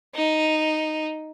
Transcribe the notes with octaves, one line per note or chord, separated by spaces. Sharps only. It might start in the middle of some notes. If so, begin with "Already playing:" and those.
D#4